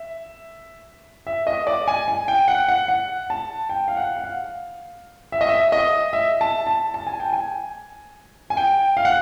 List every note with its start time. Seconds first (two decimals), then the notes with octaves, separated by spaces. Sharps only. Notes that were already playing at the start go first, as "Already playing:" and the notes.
Already playing: E5
1.27 E5
1.47 D#5
1.67 D5
1.88 G#5
2.08 G#5
2.28 G5
2.48 F#5
2.68 F#5
2.88 F#5
3.30 A5
3.69 G5
3.88 F5
3.97 F#5
4.16 F#5
4.24 F5
5.32 E5
5.41 D#5
5.49 E5
5.72 D#5
6.13 E5
6.41 A5
6.67 A5
6.94 A5
7.07 G#5
7.20 G5
7.33 G#5
8.50 G#5
8.57 G5
8.97 F5
9.05 F#5